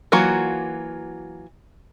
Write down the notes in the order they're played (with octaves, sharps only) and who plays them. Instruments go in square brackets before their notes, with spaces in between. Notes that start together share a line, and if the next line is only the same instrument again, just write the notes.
[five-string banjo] E3 F#3 A#3 F4 F#4